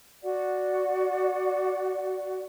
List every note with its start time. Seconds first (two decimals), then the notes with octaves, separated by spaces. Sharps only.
0.22 F#4 D5 F#5